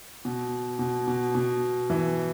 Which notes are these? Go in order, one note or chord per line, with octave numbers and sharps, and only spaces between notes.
B2
B2
B2
B2
E3